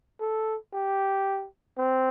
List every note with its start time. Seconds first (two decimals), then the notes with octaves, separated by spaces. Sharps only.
0.20 A4
0.74 G4
1.79 C4